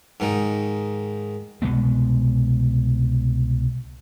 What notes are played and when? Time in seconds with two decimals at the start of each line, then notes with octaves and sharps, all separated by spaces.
0.20 G#2 D#3
1.62 C2 B2 G#3 B3